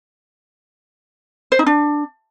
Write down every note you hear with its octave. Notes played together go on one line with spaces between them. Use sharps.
C5
D#4
D4